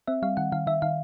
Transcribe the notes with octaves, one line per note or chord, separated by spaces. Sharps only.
C4 E5
G3 F5
D#3 F#5
D#3 F5
D#3 E5
D#3 F5